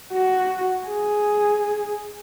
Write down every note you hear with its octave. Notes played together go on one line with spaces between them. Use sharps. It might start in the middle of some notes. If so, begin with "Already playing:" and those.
F#4
G#4